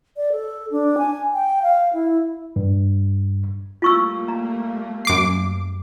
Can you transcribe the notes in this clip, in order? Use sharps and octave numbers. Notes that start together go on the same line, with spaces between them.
D5
A4
D4
G#5
G5
F5
E4
G2
G3 A3 A#3 F4 C#6 E6
A#5
F#2 D6 C7